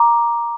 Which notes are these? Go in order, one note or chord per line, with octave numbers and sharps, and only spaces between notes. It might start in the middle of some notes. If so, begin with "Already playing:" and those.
Already playing: A#5 D6